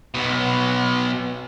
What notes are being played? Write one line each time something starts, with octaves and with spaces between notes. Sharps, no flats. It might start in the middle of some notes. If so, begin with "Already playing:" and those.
B1 B2